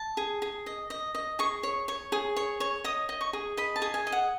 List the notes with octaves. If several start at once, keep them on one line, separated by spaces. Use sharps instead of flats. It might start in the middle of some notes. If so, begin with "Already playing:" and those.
Already playing: A5
G#4
G#4
D#5
D#5
D#5
G#4 C#6
C#5
C#5
G#4
C#5
C#5
D#5 D#6
D#5
C#6
G#4
D#5 B5
A5
G#4
G#5
D#5
F#5